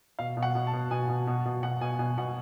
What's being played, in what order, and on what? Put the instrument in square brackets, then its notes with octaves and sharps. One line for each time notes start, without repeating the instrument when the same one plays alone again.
[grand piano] B2 F5
B2
F#5
B2
A5
B2
B2 G#5
B2
B2
B2
B2 F#5
B2 G#5
B2 G#5
B2 F#5